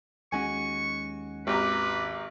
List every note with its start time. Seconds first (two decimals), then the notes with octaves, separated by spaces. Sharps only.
0.32 D#2 G#3 C#4 F#4 G#5 C#6
1.47 G#1 G4 B4 A#5 D6